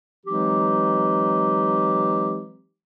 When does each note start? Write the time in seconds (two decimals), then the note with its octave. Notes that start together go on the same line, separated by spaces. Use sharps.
0.26 E3 F#3 G#3 C4 D#4 G4